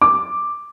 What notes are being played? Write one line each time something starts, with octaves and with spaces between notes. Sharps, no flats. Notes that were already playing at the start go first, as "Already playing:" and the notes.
D6